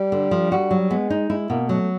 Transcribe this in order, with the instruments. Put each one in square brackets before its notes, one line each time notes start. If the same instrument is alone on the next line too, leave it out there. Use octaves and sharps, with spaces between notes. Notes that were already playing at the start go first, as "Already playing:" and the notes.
Already playing: [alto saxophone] G3
[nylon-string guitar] D3
F3
[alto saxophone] G3 [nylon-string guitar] F#4
[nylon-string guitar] F#3
[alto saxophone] G#3 [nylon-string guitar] B3
[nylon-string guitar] D#4
[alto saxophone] G#3 [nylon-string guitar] E4
[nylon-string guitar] B2 [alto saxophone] A#3
[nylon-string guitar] F#3 [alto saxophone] A3